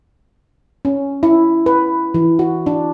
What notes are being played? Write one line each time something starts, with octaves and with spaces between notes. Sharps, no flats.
C#4
E4
B4
E3
F#4
D4